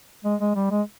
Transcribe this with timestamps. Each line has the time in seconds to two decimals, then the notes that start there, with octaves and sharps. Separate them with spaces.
0.24 G#3
0.40 G#3
0.56 G3
0.71 G#3